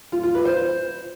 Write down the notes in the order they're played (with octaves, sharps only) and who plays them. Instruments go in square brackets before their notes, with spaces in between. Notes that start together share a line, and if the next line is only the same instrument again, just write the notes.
[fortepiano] F4
F4
B4
C5